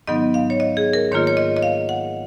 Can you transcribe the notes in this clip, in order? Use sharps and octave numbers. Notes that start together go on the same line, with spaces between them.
G#2 D#3 F#3 B3 D#4 D#5
F5
C#5
D#5
G#4
A#4
G#2 D#3 A#3 F4 C#5
C#5
D#5
D#5
F5
F#5